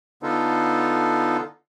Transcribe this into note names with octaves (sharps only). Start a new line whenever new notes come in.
D3 B3 D#4 F4 A4